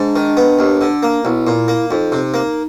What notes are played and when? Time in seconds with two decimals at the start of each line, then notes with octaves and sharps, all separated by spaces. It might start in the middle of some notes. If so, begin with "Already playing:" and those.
Already playing: G#2 D4
0.16 D#3
0.37 B3
0.59 D#2
0.81 D3
1.03 A#3
1.24 B1 E4
1.47 A#2
1.68 A#3
1.90 F2 D#4
2.12 C3
2.34 A#3